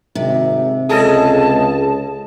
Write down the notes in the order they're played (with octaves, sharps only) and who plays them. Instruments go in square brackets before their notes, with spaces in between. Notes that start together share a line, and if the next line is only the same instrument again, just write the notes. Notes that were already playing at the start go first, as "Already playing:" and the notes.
[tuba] G#1 [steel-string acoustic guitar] C3
[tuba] C#2 [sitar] G#4 A4 D#5 [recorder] A5